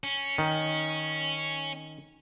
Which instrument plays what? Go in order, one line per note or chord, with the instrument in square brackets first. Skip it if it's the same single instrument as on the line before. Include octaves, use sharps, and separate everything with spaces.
[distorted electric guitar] C#4
[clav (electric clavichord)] D#3